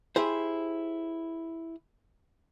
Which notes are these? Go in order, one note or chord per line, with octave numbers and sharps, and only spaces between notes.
E4 G4 G#4 C5